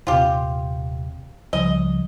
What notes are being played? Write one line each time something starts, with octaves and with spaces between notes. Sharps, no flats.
D#1 C3 F4 G4
C#2 F3 G3 D#5